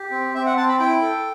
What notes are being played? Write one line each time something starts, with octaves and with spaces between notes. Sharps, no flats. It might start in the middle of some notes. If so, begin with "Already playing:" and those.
Already playing: G4
C4
C4 E5
F#5
C4 A5
B5
E4 G5
A4